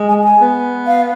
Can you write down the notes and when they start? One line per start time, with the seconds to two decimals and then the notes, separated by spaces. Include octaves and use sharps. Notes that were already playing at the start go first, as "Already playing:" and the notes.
Already playing: G#3
0.09 G#5
0.24 G#5
0.41 B3
0.87 F5